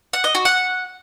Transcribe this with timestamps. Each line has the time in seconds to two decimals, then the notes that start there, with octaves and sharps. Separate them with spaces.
0.13 F#5
0.24 D#5
0.35 F#4
0.45 F#5